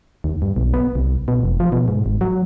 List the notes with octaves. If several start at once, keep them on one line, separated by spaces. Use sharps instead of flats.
D#2
G2
B1
B3
C2
B2
F1
F3
B2
G#2
G#1
F#3